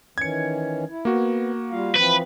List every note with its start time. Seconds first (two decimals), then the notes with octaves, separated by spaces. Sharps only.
0.18 D#3 E3 C#4 G#6 C#7
0.89 E4
1.05 A#3 B3 F#4
1.71 G3 F4 F5
1.95 E3 F3 C4 B4